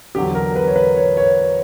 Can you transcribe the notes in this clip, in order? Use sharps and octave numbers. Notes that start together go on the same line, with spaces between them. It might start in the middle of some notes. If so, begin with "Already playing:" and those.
E2 D3 F#3 G4
A#4
B4
C#5
B4
C#5
C#5